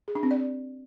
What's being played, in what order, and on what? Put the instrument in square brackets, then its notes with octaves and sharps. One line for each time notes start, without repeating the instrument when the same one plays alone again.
[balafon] G#4
D4
C4
D5